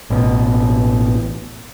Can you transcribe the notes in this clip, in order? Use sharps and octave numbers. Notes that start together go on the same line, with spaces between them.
A1 B2